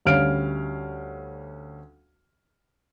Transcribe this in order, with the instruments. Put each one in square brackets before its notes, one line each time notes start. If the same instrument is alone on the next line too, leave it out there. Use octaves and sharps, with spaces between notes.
[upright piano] D2 G3 C#4 F5 F6 D7